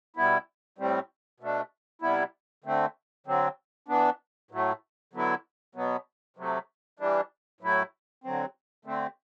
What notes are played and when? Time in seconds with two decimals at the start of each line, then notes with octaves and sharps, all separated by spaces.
0.16 B2 G3 B3 E4
0.78 A2 G3 C4
1.40 B2 A3 D4
2.02 C3 G3 B3 E4
2.64 D3 A3 C4
3.27 D3 F#3 C4
3.88 E3 B3 D4
4.51 A2 F#3 A3
5.13 D3 F#3 B3 E4
5.75 B2 F#3 B3
6.37 C3 F#3 A3
6.99 E3 G3 D4
7.61 A2 F#3 A3 E4
8.24 D3 F#3 C4
8.85 D3 A3 C4